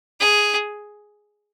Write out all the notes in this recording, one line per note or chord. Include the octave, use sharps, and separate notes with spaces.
G#4